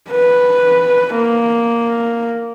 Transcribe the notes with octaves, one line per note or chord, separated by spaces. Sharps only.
B4
A#3